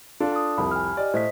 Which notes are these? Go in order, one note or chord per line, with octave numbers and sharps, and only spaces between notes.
D4 F4 A4
A5 D#6
C2 F2 G4 B5
G#5 F6
G4 D5 D#5
A2 C5 D#5 B6